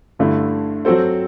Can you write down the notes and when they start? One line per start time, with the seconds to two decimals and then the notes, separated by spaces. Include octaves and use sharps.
0.19 G2 D3 A3 E4
0.85 F#3 C4 F#4 A4 C5